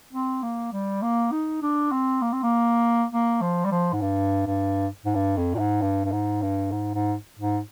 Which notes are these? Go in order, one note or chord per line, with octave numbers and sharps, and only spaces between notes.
C4
A#3
G3
A#3
D#4
D4
C4
A#3
C4
A#3
A#3
F3
G3
F3
G#2
G2
G2
G#2
G2
F2
A#2
G#2
G2
G2
G#2
G2
G#2
G#2
G#2